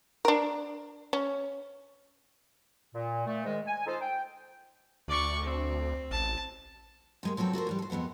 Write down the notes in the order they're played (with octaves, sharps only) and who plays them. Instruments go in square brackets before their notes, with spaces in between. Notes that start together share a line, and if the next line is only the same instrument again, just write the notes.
[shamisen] D4 A#4
C#4
[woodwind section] A#2
A#2 A3
G#2 D#3 G#3
G#5
D#4 F4 A4 C5
G5
[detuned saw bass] D2 [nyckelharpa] D5 C#6
[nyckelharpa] C4
[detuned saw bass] A1 [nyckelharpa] A5
[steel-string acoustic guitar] C3 G#3 A#3
F3 F#3 B3 C4 A4
F#4 A4 A#4 C5
G#2 E3 G3
A4 C5
F2 G#3 B3 C5 F#5